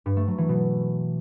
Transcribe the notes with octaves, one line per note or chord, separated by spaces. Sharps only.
G2
A3
F#3
E3
B2